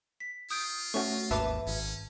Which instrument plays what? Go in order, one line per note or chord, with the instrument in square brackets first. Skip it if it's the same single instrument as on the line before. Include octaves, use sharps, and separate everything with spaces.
[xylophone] B6
[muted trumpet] F4 [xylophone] D#6 G6 D7
[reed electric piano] A3 C#4 F#4 [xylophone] C#6
[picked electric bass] G#1 D#2 [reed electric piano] B4 E5 [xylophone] A5 D6
[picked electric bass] G#1 [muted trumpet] C#4